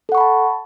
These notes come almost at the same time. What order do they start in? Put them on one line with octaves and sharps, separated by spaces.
A4 F#5 C#6 B5 A5